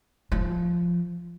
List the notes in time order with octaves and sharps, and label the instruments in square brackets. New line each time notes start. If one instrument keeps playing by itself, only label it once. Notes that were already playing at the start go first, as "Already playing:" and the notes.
[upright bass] F3